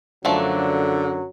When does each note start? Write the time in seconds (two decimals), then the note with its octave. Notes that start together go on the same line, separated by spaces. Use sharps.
0.25 F#2 D3 F3 F#3 A3 D4